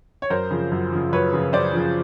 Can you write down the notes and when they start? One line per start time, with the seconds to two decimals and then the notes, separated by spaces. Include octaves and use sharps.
0.22 C#5
0.30 F#2 A#4 C5
0.51 C#3 F3
0.71 F#2
0.93 C#3 F3
1.13 F#2 B4 C#5
1.33 C#3 F3
1.53 F#2 C5 D5
1.73 C#3 F3